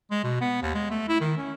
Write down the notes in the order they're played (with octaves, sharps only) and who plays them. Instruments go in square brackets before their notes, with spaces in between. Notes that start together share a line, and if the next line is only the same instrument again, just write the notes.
[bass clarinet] G#3
B2
B3
D#2
G#3
A3
E4
D#3
C#4